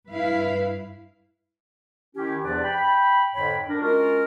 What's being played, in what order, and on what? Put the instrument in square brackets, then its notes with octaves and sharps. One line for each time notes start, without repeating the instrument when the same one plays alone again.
[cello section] G2 E4 B4 F5
[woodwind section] D#3 C#4 E4 G4
E2 C3 F3 D4 B4 D5
G5 B5
F2 G#2 D3 C#5 G5 B5
D4 A#4
G#3 C#4 F4 F#4 A#4